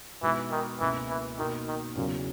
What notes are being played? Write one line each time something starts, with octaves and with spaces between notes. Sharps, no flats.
B2 E3 G#3 B3 D#4 F#4
D#3
C#2 B2 E3 A#3
E3
B2 D#3 A#3 D#4 F#4 A#4
D#3
E2 A#2 C#3 F#3 C#4